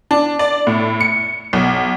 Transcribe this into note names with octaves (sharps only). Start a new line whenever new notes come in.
D4
D5
A2
C#7
B1